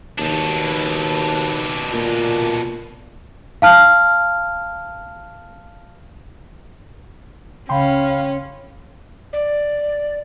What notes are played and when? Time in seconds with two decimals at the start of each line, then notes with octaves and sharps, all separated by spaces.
0.19 D#2 B2 D4
1.93 A#2
3.62 F5 A5 F6
7.69 C#2 C#3 C#4 F5 G5 B5 C6
9.33 D5